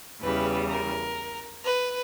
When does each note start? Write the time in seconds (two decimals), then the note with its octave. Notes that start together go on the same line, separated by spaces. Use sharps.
0.22 E2 C#3 E3 G3 B4
0.69 A#4
1.65 B4